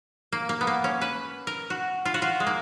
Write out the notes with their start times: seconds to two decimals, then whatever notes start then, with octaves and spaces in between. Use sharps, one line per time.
0.32 A#3
0.49 A#3
0.61 B3
0.67 A#3
0.84 C#4
1.01 B4
1.47 A#4
1.70 F#4
2.05 F4
2.14 F#4
2.22 F4
2.40 G#3
2.47 A#3